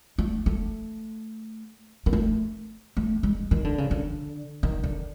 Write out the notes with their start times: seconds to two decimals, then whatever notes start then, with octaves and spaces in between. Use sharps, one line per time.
0.18 A3
0.46 A3
2.06 A#3
2.13 A3
2.97 A3
3.23 G#3
3.51 D#3
3.64 D3
3.78 C#3
3.91 D3
4.63 D#3
4.84 D3